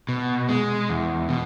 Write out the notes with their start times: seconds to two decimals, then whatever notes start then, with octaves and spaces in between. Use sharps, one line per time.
0.09 B2
0.49 G#3
0.90 E2
1.29 B2